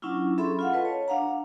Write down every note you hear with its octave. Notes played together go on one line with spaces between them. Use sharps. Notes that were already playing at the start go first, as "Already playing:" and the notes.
F#3 C#4 D4 E4 F4
C#4 G#4 A4 E5 B5 C6
F4 F5 F#5
A4 B4 D#5 A5
C#5
D4 F5 F#5 A#5